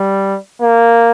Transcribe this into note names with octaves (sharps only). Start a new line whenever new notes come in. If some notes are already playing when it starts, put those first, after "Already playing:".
Already playing: G3
A#3